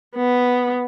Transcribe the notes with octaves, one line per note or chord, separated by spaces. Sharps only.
B3